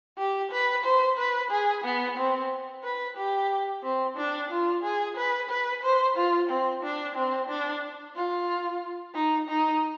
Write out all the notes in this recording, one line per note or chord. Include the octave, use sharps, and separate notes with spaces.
G4
B4
C5
B4
G#4
B3
C4
B4
G4
C4
D4
F4
G#4
B4
B4
C5
F4
C4
D4
C4
D4
F4
D#4
D#4